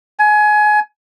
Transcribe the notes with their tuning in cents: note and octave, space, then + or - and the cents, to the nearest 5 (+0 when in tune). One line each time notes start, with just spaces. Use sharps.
G#5 +25